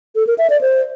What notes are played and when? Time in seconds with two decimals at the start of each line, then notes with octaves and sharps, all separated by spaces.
0.15 A4
0.27 A#4
0.38 E5
0.50 D5
0.61 C5